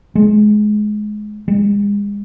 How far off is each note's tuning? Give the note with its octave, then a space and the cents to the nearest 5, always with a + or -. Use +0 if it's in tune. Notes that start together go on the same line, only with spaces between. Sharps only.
G#3 +20
G#3 -35